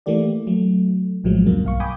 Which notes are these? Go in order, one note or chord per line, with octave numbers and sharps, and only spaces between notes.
E3 A3 A#3 G4 D5
F#3 A3
A#1 A2 F3 F#3 G#3
D2 G2 B2 A#3
B1 F5 C#6
G5 G#5 B5 D6 D#6 G6